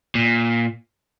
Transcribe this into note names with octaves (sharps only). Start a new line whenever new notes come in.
A#2